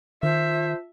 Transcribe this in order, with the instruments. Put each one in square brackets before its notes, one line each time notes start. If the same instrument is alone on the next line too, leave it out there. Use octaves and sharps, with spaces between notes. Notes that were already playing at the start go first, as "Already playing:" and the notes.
[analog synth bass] D#3 [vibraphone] F4 A5 [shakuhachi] C5 [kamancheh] E5